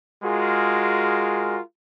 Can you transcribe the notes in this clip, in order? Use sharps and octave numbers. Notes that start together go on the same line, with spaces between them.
G#3 F4 F#4 G#4 A#4